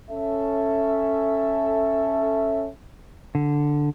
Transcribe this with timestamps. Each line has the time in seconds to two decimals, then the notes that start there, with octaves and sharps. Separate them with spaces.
0.10 C#4 A4 E5
3.35 D3